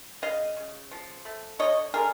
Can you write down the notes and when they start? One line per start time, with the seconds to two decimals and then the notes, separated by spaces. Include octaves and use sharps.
0.22 C#3 D#5 F5
0.56 C#3
0.91 F3
1.25 A3
1.59 D3 C#5 D#5
1.94 D3 G#4 A#4